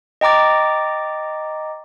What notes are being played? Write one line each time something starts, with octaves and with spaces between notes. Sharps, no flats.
D#5 G5 A#5 D6 A6